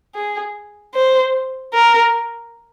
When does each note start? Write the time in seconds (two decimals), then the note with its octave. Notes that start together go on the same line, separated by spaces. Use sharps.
0.15 G#4
0.95 C5
1.74 A#4